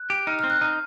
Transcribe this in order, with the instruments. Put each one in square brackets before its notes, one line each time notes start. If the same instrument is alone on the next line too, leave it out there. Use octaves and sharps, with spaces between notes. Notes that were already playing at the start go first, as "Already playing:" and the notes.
Already playing: [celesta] F#6
[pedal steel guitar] G4
[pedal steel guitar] D#4 [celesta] F6
[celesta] F6
[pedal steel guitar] C4
[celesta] F#6
[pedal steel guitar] D#4 [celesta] F6